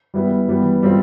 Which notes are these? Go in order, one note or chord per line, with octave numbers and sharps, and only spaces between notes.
G3 B3 E4 B4
E3 G3 B3
G3 C4 F4 C5